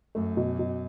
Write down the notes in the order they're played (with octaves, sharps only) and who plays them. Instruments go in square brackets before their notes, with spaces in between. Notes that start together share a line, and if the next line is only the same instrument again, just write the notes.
[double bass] F#2 [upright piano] A3
[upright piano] B2
B2